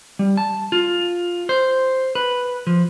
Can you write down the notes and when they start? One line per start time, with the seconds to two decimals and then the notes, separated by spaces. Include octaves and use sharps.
0.19 G3
0.37 A5
0.72 F4
1.49 C5
2.15 B4
2.67 F3